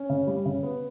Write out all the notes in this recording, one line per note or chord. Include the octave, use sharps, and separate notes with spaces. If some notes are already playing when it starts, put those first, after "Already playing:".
Already playing: C#4
C#3
G3
C#3
B3